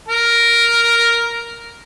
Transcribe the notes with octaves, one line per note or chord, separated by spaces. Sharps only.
A#4